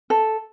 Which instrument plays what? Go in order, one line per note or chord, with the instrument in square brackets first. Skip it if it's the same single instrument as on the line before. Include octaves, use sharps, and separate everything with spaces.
[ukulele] A4